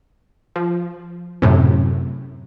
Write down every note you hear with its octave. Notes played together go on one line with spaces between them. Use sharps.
F3
F#2 A2 C3